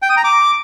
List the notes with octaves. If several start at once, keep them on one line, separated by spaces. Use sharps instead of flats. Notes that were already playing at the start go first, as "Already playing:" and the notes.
G5
D#6
A#5
D6